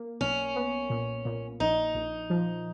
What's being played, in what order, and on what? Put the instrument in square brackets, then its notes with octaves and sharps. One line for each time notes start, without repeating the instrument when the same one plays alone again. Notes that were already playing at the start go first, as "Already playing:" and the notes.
Already playing: [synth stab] A#3
[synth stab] B1 [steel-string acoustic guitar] C#4
[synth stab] B3
A#2
A#2
[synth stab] A#1 [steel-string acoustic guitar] D#4
[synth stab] A#1
F3